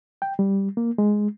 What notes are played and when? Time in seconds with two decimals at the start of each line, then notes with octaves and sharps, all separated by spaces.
0.22 G5
0.39 G3
0.77 A#3
0.98 G#3